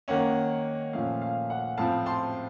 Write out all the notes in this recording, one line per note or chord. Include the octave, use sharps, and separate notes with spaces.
D#3 A#3 C#4 F#5
A#2 F3 A3 C#4 F5
F5
F#5
A2 F3 C4 F5 A5
A5 C6